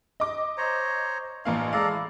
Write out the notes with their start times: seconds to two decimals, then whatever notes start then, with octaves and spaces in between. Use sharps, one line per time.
0.20 D#5 D6
0.58 C5 C#5 A#5
1.45 A1 A#3 C#4 D4 F5
1.73 G#3 G#4 A4 D5 F5 A#5
1.89 E4